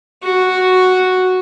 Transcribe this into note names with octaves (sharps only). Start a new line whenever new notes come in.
F#4